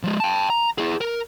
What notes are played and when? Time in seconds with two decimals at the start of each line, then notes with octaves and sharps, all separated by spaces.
0.03 F3 G#3
0.20 G5 A5
0.50 A#5
0.78 E4 G#4
1.01 A#4